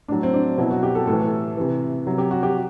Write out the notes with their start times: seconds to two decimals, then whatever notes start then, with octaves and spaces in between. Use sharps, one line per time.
0.08 A2 F#3 D4
0.23 C4
0.33 D4
0.58 B2 F#3 E4
0.71 F#4
0.83 G4
0.95 A4
1.07 A2 E3 A4
1.57 C3 E3
2.06 C3 F#3
2.18 G4
2.31 F#4
2.43 G4